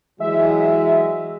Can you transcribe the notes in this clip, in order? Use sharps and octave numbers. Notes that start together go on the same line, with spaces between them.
E3 F#3 G#3 E5